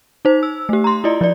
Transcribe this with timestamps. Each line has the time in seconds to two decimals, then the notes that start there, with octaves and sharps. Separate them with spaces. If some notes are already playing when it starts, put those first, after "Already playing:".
0.25 D#4 C5
0.43 E6
0.69 A3 G4
0.84 A#5 C6
1.04 E4 F4 D5 D#5
1.21 F3 D5